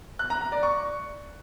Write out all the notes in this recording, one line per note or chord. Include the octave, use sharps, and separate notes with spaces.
F#6
A#5
A#5
D5
C#6